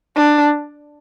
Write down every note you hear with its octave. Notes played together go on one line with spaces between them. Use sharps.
D4